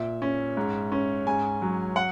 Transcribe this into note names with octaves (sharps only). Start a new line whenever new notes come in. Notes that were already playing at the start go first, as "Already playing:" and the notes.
Already playing: A#2 E5
C#4
G#2
C#4
G#2 G#5
F#3
F#5